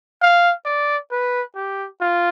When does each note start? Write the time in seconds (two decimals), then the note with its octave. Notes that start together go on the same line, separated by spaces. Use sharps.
0.21 F5
0.65 D5
1.11 B4
1.55 G4
2.00 F4